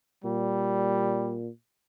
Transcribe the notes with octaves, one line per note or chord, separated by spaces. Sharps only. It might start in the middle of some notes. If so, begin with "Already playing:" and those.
A#2 G3